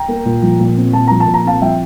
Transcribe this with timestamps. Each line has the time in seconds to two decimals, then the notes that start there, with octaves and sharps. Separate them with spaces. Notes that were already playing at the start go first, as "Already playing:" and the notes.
Already playing: G5 A#5
0.08 A#3
0.25 A#2
0.42 F3
0.60 A#2
0.77 C4
0.93 A#2 A5
1.08 F3 A#5
1.20 A5
1.27 A#2
1.34 A#5
1.45 C4 F5 A5
1.62 F3 E5 G5